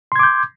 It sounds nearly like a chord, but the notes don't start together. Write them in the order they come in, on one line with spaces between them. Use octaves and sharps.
C6 G#6 D6 G6